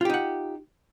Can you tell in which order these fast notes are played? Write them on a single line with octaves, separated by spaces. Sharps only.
F4 G4 D#4 F#5